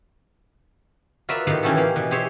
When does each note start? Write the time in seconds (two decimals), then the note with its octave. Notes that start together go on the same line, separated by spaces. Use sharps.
1.29 F4 F#4 A#4 B4 D5 E5
1.47 A2 D#3 B3 G4 F5
1.63 E3 C#4 F#4 G4 A4
1.77 A#3 G4 F5
1.96 B2 E3
2.11 G4 G#4 C5 C#5 E5